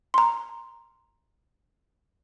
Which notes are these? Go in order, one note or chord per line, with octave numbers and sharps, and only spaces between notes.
A#5 C6